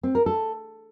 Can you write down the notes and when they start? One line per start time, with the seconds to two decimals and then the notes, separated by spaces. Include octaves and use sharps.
0.03 C4
0.15 A#4
0.26 A4